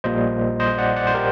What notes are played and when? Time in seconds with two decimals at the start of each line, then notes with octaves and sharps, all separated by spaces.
0.04 A#1 A#2 G3 A#3 C5 D#5
0.60 C5 D#5
0.78 D5 F#5
0.96 D5 F#5
1.07 C5
1.14 G4 A#4